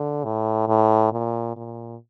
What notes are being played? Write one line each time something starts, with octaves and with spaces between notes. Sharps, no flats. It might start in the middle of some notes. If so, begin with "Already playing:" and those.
Already playing: D3
A2
A2
A#2
A#2